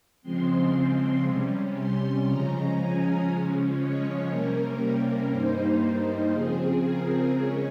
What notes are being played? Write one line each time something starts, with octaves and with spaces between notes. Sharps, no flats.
C#3 F3 G#3 C4 C6
C3 G3 C#4
C6
C#3 F3 G#3 C#4 A#5
G#5
C#3 F3 G#3 C#4
C#5
C3 G3 A#3 C#4 A#4
G2 G3 A#3 D#4 C5
C#3 F3 C4 G#4
A#4
C#3 G#3 C#4 C#5